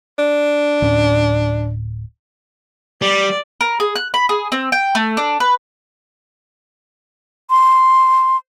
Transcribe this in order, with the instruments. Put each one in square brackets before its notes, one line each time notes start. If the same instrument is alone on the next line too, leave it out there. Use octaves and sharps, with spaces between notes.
[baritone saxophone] D4
[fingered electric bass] D1 A2 C#4
[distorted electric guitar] G3 [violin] D5
[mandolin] A#4
G#4
F#6
B5
G#4
C4
G5
A3
D4
B4
[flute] C6